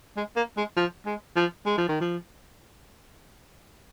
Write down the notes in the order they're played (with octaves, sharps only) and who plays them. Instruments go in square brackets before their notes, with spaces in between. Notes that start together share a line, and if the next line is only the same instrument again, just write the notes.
[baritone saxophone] G#3
A#3
G#3
F3
G#3
F3
G#3
F3
D#3
F3